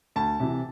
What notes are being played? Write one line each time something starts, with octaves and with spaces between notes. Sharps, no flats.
D2 A5
C3 E3